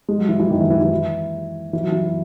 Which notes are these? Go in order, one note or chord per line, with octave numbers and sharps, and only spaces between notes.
G#3
F#3
E3
E3
D#3
E3
E3
E3
E3
F#3
E3